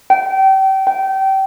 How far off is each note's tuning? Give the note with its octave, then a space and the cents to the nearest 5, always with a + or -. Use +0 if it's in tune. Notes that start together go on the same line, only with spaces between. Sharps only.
G5 -30
G5 -25